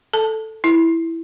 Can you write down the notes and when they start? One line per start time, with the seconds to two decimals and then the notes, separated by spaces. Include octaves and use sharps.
0.13 A4 A5
0.64 E4